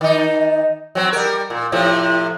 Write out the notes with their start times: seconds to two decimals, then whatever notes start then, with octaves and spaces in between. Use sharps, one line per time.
0.01 D#3 D#4
0.95 F#3 C4
1.13 G3 A#4
1.50 A#2
1.72 A2 C3 F3